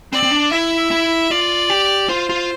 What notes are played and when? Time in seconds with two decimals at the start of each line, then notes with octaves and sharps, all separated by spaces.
0.13 C4 D5
0.23 C4
0.31 D4
0.51 E4 E5
0.91 E4
1.31 F4 D5
1.70 G4
2.09 F4 C5
2.29 F4